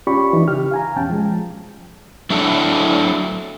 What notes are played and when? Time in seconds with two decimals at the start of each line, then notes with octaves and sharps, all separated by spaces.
0.07 C#4 F4 G4 D5 B5 C#6
0.33 E3 D#4
0.48 C#3 G4 F6
0.71 F5 G#5 A#5
0.96 E2 B2 C#4 G5 A5
1.10 F3 G#3
2.30 F#3 D4 E4 F#4 A4